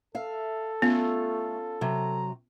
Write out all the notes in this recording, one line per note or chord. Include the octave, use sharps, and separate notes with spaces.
A4 E5 F5
A3 B3 C#4 F4
C3 F#3 A#5